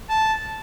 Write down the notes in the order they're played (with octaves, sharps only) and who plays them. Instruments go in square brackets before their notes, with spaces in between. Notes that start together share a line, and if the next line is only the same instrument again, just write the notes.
[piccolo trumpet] A5